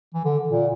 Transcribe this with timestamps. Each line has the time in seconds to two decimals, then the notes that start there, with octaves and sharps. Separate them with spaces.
0.14 E3
0.25 D3
0.49 A#2